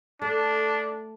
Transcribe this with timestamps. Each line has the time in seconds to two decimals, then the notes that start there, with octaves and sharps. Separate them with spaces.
0.22 A3 D4